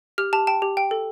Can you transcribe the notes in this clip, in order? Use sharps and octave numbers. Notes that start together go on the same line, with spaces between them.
G4 F6
G4 A5
G5 A5
G4
G5
A4